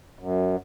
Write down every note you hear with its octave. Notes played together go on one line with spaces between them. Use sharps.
F#2